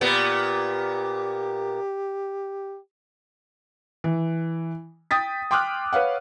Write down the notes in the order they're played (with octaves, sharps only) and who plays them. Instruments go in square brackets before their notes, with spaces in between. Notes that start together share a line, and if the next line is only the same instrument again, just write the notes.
[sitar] A#2 B3 [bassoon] G4
[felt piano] E3
G5 D#6 A6 B6
G5 C6 D6 D#6 F6 F#6
B4 C#5 F5 F#5